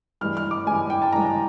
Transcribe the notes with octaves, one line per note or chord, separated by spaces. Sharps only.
G2 E3 G#3 F6
F6
D6
G2 E3 G#3 G#5
G5
A5
G2 E3 G#3 A#5